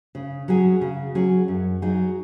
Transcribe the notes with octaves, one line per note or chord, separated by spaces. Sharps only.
C#3
F#3 C#4 G#4
C#3
F#3 C#4 G#4
F#2
F#3 D#4 G#4